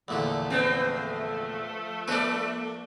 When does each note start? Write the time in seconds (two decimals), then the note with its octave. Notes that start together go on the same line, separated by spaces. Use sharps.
0.08 E2 A#2 D3 F3 A3
0.50 G#3 B3 C4
2.08 A#3 D4 A4 B4 D5